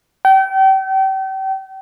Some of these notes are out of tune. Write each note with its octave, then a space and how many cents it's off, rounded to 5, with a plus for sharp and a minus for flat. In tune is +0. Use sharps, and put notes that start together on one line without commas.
G5 -35